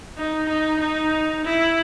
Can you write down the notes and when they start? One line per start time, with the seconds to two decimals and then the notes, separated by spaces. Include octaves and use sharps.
0.18 D#4
0.49 D#4
0.81 D#4
1.45 E4